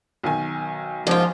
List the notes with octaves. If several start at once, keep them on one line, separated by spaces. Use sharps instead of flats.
B1 D#3 G#5
G#2 F3 F4